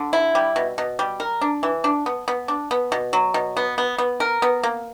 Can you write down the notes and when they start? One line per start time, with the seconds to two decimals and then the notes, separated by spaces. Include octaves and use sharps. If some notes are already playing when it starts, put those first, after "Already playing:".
Already playing: D3
0.13 E4
0.35 G3
0.56 B2
0.78 B2
0.99 G3
1.20 A#4
1.41 D4
1.63 E3
1.84 D4
2.06 B3
2.28 B3
2.48 D4
2.71 B3
2.92 B2
3.13 F#3
3.34 B2
3.57 B3
3.78 B3
3.98 B3
4.20 A#4
4.42 B3
4.63 A#3